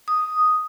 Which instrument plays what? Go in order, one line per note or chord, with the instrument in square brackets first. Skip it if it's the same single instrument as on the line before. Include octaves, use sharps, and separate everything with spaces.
[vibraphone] D#6